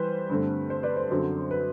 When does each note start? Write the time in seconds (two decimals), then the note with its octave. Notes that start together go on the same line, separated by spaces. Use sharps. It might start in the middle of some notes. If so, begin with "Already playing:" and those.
Already playing: E3 G3 B4 C5
0.30 G2 D3 A3 C4
0.70 C5
0.83 B4 D5
0.97 C5
1.10 F#2 D3 F#3 C4
1.51 B4